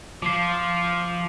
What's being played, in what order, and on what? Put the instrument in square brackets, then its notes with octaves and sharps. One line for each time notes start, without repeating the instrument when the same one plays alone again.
[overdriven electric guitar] F3 [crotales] D6 C7